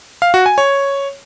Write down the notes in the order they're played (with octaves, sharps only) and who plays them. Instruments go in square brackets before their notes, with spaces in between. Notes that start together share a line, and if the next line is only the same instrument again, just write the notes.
[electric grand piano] F5
F#4
G#5
C#5